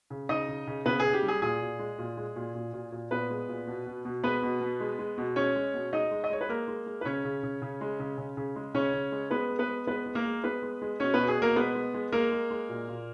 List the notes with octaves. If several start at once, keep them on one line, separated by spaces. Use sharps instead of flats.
C#3
C#3 D#4 D#5
C#3
C#3
C#3 B3 B4
C#3 G#4
G4
G3
G#4
A#2 G#4
A#2
G#3
A#2
G#3
A#2
A#2
A#2
A#2
A#2 B3 B4
G#3
A#2
B2
B2
B2
G#3 B3 B4
B2
B2
G#3
G#3
B2
G#3 C#4 C#5
G#3
B2
G#3 D#4 D#5
G#3
D#5
G#3 C#5
B4
G#3 A#3 A#4
G#3
G#3
B4
C#3 C#4 C#5
C#3
C#3
C#3
G#3
C#3
C#3
C#3
G#3
C#3 C#4 C#5
C#3
G#3
G#3 B3 B4
G#3
B3 B4
G#3
G#3 B3 B4
G#3
A#3 A#4
G#3
G#3 B3 B4
G#3
G#3
B2 C#4 C#5
B2 B3 B4
G#4
B2 A#3 A#4
G#3 B3 B4
G#3
G#3
G#3 A#3 A#4
G#3
G#3
A#2
A#2